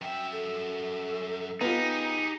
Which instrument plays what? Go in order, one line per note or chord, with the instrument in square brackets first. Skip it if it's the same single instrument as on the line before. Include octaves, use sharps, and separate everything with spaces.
[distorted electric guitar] F#2 E5 [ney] G5
[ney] A4
[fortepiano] B3 F4 [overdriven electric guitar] D#4 [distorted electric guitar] G4 G#4